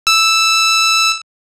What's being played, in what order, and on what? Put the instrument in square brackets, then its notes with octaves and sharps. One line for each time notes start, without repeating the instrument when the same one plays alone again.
[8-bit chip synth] E6